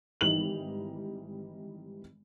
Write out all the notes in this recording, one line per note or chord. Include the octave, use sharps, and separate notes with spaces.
G#1 E3 G3 D#4 F7 F#7